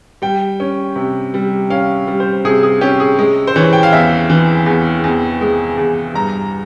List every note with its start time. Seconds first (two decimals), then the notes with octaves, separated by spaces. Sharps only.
0.22 G3 G5
0.60 C#4
0.96 C3
1.34 G3
1.70 C#4 F5
2.07 G3
2.20 C5
2.45 C3 G#4
2.63 G#4
2.81 C#4 G4
3.00 G#4
3.19 G#3
3.47 C5
3.56 E3 C#5
3.73 G5
3.83 F5
3.93 E2 E5
4.30 E3
4.66 E2
5.04 E2
5.41 G#3
5.78 E2
6.14 G2 A#5